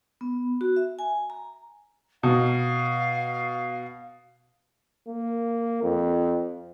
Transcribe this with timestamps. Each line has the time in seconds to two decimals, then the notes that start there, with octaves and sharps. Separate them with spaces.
0.21 B3
0.61 F#4
0.76 E5
0.99 G#5
1.30 A#5
2.23 B2 F5
5.08 A#3
5.83 F2